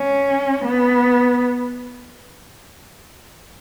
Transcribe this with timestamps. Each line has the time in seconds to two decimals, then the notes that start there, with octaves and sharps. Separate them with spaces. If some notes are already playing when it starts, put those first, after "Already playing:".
Already playing: C#4
0.65 B3